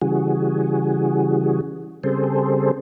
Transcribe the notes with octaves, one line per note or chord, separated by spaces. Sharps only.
C#3 E3 G3 F#4 G#4
C#3 G3 C4 G#4 A4 C5